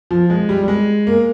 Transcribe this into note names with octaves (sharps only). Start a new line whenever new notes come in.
F3
G#3
G3
G3
G#3
A#3